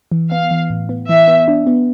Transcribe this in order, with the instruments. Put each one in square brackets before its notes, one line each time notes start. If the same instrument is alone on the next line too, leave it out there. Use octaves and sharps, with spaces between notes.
[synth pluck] E3
[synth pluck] B3 [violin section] F5
[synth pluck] E3
A2
B3
[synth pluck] E3 [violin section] E5
[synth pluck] B3
D4
B3